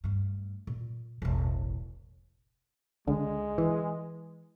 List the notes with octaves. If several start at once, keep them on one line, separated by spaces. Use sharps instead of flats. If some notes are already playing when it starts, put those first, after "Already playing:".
G2 A3
A#2
E1 A1
C#2 D3 G#3
E3